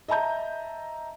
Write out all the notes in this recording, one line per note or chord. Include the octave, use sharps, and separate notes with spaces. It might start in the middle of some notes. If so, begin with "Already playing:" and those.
D#5 E5 A5 A#5 G6